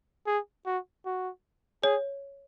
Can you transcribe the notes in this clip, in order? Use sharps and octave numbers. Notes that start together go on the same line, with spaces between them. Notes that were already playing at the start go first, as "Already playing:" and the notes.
G#4
F#4
F#4
G#4 C#5